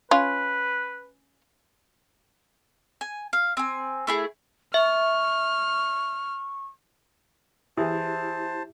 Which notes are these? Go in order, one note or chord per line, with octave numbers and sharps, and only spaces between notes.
C#4 F4 B4
G#5
F5
C4 G#5
A3 E4 G#4
E5 C#6 F6
E3 E4 G4 G#4 C5 E5 A5 D#6